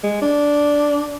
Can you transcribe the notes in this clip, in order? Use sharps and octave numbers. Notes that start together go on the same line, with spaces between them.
G#3
D4